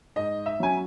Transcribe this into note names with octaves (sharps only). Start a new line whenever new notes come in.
G#2 D#5
E5
F#3 C#4 G#5